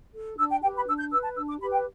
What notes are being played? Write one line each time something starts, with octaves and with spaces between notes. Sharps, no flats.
A4
D4 E6
G5
G4 B4 G5
B5
D4 E6
G6
B4 E6
A5
D4 E6
D6
G4 B4 B5
G5